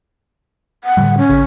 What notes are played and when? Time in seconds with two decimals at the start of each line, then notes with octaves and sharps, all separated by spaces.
0.84 F#5
0.97 A2 D3 G3
1.18 C#4
1.29 G#1 C#3